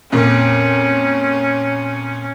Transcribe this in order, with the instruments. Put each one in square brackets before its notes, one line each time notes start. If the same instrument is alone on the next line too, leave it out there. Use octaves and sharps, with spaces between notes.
[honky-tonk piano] F2 A#2 [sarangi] C#4